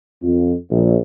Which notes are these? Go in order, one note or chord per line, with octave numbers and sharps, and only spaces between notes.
F2
A#1